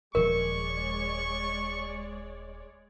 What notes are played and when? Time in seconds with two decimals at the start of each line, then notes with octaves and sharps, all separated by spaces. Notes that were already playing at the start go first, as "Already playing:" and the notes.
0.15 D#1 A#2 F3 G#3 A#4 C#5 D5 C#6